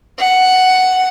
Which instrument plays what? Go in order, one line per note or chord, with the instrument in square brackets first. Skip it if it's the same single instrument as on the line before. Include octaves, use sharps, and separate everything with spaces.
[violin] F#5